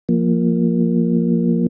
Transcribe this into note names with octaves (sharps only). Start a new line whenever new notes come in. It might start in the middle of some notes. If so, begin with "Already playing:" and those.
F3 A#3